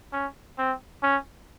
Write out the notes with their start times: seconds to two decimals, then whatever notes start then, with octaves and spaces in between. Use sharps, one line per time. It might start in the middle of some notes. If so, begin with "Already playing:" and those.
0.13 C#4
0.59 C4
1.03 C#4